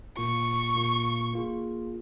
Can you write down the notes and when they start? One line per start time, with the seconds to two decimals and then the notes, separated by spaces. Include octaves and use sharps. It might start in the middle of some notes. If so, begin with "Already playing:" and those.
0.17 A#2 A#3 F4 C#6
0.75 A#2 A#3 F4
1.33 A#3 F4 G#4